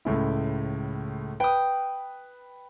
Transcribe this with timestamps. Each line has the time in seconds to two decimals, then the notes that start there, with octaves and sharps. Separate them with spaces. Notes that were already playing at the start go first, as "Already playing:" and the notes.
0.05 C#2 A2 E4
1.40 B4 G5 D#6